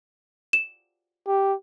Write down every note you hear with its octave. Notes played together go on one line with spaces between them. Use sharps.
E7
G4